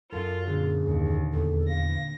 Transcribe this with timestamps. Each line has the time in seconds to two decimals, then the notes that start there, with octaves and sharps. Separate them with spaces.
0.13 F#2 F4 A4 A#4
0.47 A#2 D3 G#4
0.84 D#2
1.33 E2 A4
1.69 F5 A#6